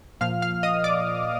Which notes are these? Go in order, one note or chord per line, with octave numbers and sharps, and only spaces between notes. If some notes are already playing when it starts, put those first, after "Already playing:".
A#2 F3 A#3 F5 F6
F5 F6
D#5 D#6
D5 D6